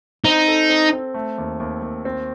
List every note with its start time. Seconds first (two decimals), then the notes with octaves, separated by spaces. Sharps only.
0.25 C4 D#4
0.48 A4
0.69 C4
0.93 C4
1.14 A3
1.38 D#2
1.60 D#2
1.82 D#2
2.05 C4